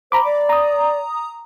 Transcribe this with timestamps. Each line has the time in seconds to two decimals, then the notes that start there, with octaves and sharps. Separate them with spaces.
0.12 C5 A#5 B5 D6
0.24 D5
0.49 A#5 D#6